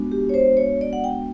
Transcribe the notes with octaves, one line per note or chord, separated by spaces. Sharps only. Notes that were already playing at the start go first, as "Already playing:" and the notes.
Already playing: G#3 B3 D4 F#4
G4
C#5
C5
C#5
D5
F#5
G5